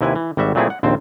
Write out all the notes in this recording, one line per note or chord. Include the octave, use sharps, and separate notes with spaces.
D#2 C3 E4 B4 G#5
E3
G#1 G3 F#4 E5
A#2 F#3 A3 C4 E4 G#4
F#5
A#1 D#2 C4 C5